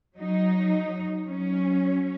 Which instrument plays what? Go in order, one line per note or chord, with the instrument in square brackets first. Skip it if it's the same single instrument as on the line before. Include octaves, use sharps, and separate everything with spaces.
[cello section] F#3 D#4
F#3 C#4